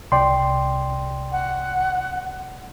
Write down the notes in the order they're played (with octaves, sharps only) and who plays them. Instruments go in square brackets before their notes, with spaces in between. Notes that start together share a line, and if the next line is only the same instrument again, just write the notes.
[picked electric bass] C2 [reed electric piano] D5 G5 C6
[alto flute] F#5